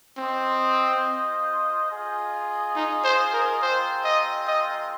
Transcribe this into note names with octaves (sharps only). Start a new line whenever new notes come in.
C4 F4 C5 D#5
F4 G#4 D#5
D#4
C5
A#4
G#3 C4 F4 A#4 C5
D#5
D#5